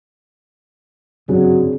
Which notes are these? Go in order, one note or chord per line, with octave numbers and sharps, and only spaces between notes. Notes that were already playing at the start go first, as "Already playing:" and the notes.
G1 F#2 C#3 F#3 C4 D4 G#4